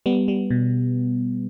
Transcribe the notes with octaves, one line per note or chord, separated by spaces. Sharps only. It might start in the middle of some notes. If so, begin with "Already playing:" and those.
G3 B3
G3
B2